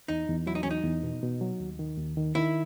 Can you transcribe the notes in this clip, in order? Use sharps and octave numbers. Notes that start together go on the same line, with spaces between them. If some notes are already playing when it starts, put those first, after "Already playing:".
E2 D#4
E2
F#3 E4
D#4
C#4
E2 D#4
E2
B2
B2
F#3
D#2
D#3
D#2
D#3
D#3 E4